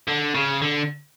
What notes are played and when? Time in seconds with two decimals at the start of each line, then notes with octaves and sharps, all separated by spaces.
0.08 D3
0.35 C#3
0.62 D3